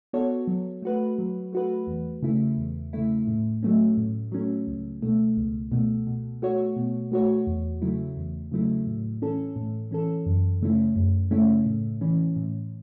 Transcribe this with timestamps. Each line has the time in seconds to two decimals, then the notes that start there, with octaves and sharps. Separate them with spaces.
0.13 B3 F#4 A4 C#5
0.47 F#3
0.82 A3 F#4 B4
1.18 F#3
1.53 A3 F#4 B4
1.87 E2
2.22 C#3 A3 E4
2.57 E2
2.93 C#3 A3 E4
3.27 A2
3.62 F#3 A3 C#4
3.97 A2
4.32 F#3 A3 C#4
4.67 C#2
5.02 B2 A3
5.37 C#2
5.72 B2 A3
6.07 B2
6.42 A3 F#4 C#5
6.76 B2
7.12 A3 F#4 C#5
7.47 E2
7.82 C#3 F#3 A3 E4
8.17 E2
8.52 C#3 F#3 A3 E4
8.87 A2
9.22 E3 C#4 A4
9.56 A2
9.91 E3 C#4 A4
10.26 F#2
10.62 C#3 A3 C#4 E4
10.96 F#2
11.31 C#3 A3 C#4 E4
11.66 A2
12.01 E3 C#4
12.36 A2